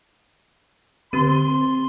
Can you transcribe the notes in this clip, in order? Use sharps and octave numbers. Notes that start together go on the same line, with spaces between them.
D3 C4 G4 C6